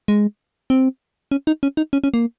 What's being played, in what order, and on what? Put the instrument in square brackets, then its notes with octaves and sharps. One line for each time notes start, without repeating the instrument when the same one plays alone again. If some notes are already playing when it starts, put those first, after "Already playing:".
[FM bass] G#3
C4
C#4
D#4
C#4
D#4
C#4
C#4
A#3